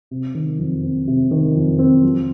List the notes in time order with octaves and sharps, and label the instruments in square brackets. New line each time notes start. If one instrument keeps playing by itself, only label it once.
[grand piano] C3
D#3
F2
C4
C3
D#3
F2
C4
F3